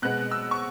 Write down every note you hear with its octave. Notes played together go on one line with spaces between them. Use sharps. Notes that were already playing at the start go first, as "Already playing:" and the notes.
B2 G#3 B3 F#6
E6
C#6